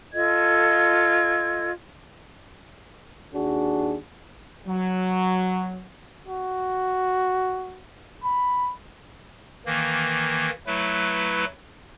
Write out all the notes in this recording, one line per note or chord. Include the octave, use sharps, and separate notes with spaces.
F4 A4 D#5 G#6
D#2 D4 F#4 G#4
F#3
F#4
B5
D#3 E3 A#3
F#3 A3 E4 B4